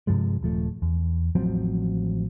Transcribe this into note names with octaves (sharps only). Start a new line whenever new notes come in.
G2 C3 F3 G#3
D#1 F3 A3
E2
A1 F3 F#3 C4